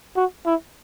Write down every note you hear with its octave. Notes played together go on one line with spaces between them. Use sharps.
F#4
E4